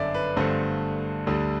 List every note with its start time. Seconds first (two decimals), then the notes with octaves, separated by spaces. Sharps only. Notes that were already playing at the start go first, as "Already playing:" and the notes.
Already playing: G1 F#2 D3 D5 E5
0.14 B4
0.36 G1 G2 D3 A3 C5
1.27 D2 D3 G3